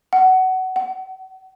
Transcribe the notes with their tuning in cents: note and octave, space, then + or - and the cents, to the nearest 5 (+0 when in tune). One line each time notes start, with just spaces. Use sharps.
F#5 +20
F#5 +40